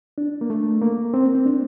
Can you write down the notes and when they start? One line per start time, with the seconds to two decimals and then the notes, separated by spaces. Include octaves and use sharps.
0.18 D4
0.41 A#3
0.50 A3
0.82 A#3
1.14 C4
1.24 A#3
1.35 C4
1.46 D4